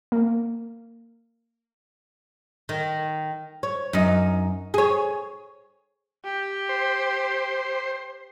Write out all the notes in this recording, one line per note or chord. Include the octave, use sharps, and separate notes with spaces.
A#3
D#3
C#5
F#2 D#4
G#4 C#5
G4
C5